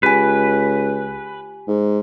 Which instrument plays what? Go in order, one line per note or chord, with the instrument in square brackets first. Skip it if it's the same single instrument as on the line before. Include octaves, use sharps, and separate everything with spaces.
[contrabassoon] C#2 [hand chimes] G4 G#5 [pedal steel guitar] B4
[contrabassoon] G#2